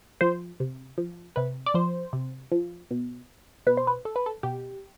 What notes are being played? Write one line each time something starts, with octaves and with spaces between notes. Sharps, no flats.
F3 C5
C3
F3
C3 B4
D5
F3 C5
C3
F3
B2
B2 B4
C5
B4
A4
B4
A4
B2 G4